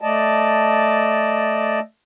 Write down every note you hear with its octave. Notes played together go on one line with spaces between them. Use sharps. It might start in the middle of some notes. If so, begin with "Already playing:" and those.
A3 D5 D#5 A5